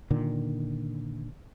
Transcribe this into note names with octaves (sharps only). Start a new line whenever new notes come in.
A#2 D3 D#3